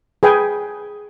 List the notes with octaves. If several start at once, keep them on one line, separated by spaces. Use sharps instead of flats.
G#4 B4 G5 G#5